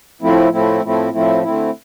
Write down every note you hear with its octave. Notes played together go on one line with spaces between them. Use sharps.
A2 F3 A3 C4 E4
A2 F3 A3 C4 E4
A2 F3 A3 C4 E4
A2 F3 A3 C4 E4
D3 A3 C4 E4